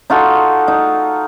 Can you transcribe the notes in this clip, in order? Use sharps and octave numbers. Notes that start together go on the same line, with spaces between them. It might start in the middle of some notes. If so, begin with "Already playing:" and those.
D#4 F4 F#4 A4
D#4